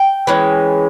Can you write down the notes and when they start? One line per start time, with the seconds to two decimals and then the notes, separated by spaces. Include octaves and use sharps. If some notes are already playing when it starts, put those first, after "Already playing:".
Already playing: G5
0.27 E3 G#3 C#4